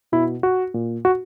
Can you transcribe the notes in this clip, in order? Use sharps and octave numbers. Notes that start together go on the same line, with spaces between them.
B2 E4
F#4
A#2
F#4